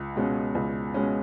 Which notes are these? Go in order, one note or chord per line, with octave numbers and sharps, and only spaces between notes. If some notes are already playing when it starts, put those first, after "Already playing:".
Already playing: C#2
B2 G#3 C#4
C#2
B2 G#3 C#4